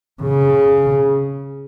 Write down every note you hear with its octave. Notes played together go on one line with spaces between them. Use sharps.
C#3